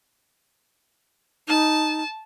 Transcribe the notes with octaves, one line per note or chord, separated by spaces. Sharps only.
D#4 A5